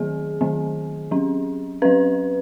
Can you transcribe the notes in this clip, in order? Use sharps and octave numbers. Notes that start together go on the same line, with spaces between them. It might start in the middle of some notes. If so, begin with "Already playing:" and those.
Already playing: D#3 F#3 B3 G#4
D#3 F#3 B3
F#3 C#4
F#3 C#4 B4